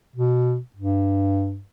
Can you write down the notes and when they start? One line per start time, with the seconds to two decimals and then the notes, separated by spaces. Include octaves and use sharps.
0.16 B2
0.76 G2